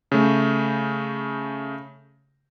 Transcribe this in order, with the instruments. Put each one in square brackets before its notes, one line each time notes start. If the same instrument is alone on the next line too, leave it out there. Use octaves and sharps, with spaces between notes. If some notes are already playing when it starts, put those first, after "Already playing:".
[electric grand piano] C#3 A3